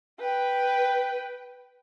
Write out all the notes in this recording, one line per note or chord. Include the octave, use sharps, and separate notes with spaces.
B4 G5